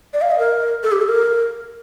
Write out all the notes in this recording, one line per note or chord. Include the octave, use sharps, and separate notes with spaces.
D5
F5
D#5
A#4
A4
G4
A4
A#4